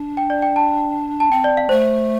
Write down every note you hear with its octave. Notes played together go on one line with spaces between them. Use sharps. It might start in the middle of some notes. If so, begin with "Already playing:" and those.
Already playing: D4
G5
D5
G5
A5
A5
C4 G5
D5
F5
A3 C5